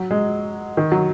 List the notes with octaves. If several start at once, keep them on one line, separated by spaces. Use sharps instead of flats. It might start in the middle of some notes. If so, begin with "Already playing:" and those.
Already playing: F#3
G#3
D#3
F#3